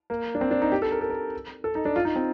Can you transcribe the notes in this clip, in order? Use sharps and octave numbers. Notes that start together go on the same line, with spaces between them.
A#3
D4
C4
D4
D#4
G4
A4
A#4
A4
A#4
A4
D#4
D4
F4
D#4
C4